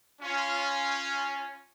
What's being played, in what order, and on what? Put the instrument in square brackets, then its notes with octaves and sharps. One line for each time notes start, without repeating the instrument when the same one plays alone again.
[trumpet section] C#4 F4